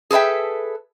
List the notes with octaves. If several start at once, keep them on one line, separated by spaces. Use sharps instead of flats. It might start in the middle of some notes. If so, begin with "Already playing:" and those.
G#4 A4 B4 E5 G5